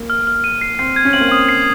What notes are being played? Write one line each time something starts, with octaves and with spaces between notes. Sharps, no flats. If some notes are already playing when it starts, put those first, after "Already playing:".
Already playing: A#3
F6
F6
D#7
C7
C4 C7
G#6
C#4
C4 F#7
A#3
C4 D#6
C7